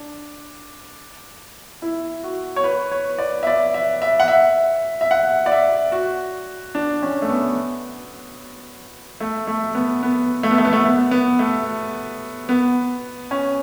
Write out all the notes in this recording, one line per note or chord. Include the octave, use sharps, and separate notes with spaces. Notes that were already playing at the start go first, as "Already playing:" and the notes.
Already playing: D4
E4
F#4
C#5
B4
C#5
D5
E5
D5
E5
E5
F#5
E5
E5
F#5
D5
E5
F#4
D4
C#4
A3
B3
A3
A3
B3
B3
A3
B3
A3
B3
A3
B3
B3
A3
B3
C#4